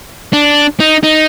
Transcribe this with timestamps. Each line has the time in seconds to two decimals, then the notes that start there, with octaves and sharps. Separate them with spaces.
0.33 D4
0.80 D#4
1.03 D#4